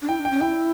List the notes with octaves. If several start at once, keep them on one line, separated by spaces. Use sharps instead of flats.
D4
E4 G5
D4
G5
C#4
E4 G5